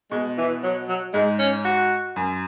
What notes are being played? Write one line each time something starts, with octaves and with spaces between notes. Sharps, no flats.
B2 G#3
E3
F#3
F#3
G#2 G#3
C#4
F#4
F#2